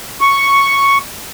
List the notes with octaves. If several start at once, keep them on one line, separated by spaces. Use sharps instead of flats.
C#6